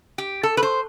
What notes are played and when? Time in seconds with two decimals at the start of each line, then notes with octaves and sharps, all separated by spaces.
0.18 G4
0.43 A4
0.57 B4
0.63 C5